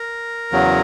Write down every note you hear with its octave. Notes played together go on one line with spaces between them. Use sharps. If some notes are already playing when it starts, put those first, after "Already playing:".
Already playing: A#4
E2 C#3 F#3